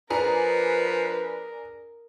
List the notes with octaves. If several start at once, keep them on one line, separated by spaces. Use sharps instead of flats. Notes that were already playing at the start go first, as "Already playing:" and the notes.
F3 D4 G#4 A#4 B4 A#5